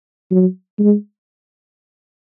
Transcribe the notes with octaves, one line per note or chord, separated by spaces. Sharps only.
F#3
G#3